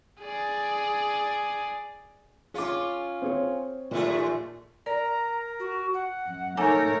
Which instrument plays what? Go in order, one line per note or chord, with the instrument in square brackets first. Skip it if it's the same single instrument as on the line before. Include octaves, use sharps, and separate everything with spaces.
[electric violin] G#4 D5
[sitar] C#4 F4 [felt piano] G#4 D6
[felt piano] C4 G#4 C#5
[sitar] D#2 A3 G#4 [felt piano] A#2
[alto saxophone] A#4 [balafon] D5 [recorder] A#5
[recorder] F#4
F#5
[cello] F#2
[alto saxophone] A3 [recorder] D#4 [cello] A#4 C#5 [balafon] G#5 A#5 D6